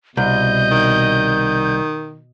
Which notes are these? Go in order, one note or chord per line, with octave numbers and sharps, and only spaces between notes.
C2 B2 D#5 G6
D#3